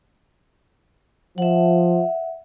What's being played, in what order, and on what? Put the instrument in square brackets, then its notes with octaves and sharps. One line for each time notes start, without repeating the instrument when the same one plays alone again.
[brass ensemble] F3 [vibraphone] E5 F#5